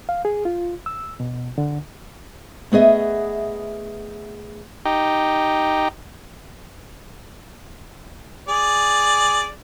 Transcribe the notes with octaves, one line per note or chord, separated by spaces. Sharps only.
F5
G#4
F4
E6
B2
D3
A3 B3 G#4 D#5 E5
D#4 G4
G#4 D5